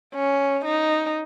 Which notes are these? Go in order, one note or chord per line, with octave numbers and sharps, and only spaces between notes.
C#4
D#4